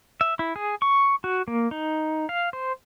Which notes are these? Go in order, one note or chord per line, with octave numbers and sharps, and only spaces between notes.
E5
E4
G#4
C#6
F#4
A#3
D#4
F5
C5